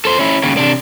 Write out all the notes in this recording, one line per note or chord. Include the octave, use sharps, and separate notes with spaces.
A4 C5
C#4 E4
D#2 C#3
C3 D4